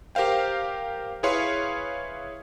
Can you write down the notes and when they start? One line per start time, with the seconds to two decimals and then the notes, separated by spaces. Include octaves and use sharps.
0.15 G4 A#4 C5 F5 G5
1.23 E4 G#4 B4 C#5 F5 C6